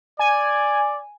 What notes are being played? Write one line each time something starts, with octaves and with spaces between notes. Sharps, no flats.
D5 G#5